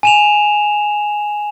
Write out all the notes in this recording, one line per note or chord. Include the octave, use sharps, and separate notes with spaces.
G#5 E7 F7